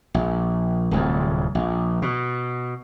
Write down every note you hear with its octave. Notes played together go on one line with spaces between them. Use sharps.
A#1
D1 C2 F2
A#1
B2